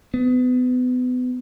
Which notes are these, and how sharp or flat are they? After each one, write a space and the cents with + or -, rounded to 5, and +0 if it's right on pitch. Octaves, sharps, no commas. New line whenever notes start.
B3 +30